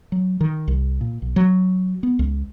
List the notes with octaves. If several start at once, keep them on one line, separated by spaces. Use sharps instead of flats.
F#3
D#3
C2
A#2
B1
F#3
B3
C#2